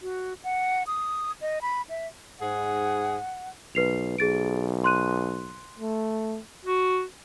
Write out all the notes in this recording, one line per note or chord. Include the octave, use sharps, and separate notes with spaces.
F#4
F#5
D#6
D#5
B5
E5
G#2 G#4 F#5
B1 B4 C7 F7
B1 G#4 A6 D7
C6 F#6 D#7
A3
F#4